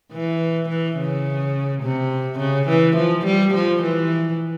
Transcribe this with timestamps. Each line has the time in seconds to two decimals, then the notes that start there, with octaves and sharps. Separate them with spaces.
0.13 E3
0.69 E3
0.98 C#3
1.83 C3
2.40 C#3
2.69 E3
2.97 F3
3.26 G3
3.54 F3
3.83 E3